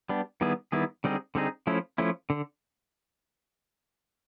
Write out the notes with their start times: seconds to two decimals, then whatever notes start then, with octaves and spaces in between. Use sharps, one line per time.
0.09 G3 B3 D4
0.41 D#3 G3 B3 E4 G#4
0.72 D#3 G3 B3 E4 G#4
1.04 D3 G3 C4 D#4 G#4
1.35 D3 G3 C4 D#4 G#4
1.67 F3 A3 C#4 E4
1.98 F3 A3 C#4 E4
2.30 D3